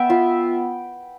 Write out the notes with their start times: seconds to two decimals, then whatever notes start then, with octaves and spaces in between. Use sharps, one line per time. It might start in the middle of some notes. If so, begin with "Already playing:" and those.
Already playing: B3 E5 G5
0.10 F4